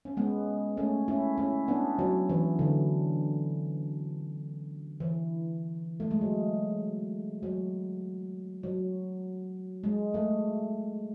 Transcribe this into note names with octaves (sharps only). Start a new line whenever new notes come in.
C#4
G#3 B3
A3 C#4
C#4 E4
C#4 E4
B3 D4
F#3
E3
D3
E3
A3
G#3
F#3
F#3
F#3
G#3
A3